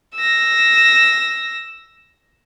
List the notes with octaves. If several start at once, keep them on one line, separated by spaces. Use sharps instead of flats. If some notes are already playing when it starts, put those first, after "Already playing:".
E6 A#6